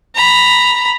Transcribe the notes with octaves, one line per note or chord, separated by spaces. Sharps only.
A#5 B5